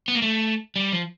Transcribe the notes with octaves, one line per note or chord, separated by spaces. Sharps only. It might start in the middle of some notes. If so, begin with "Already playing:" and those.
B3
A#3
A3
G3
F3